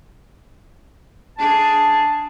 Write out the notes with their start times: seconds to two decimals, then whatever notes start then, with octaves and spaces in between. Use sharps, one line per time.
1.38 D4 G#4 A5